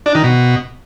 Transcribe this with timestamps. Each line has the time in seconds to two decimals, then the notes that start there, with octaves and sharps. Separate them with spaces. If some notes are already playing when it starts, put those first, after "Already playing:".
0.06 D4
0.15 D#3
0.24 B2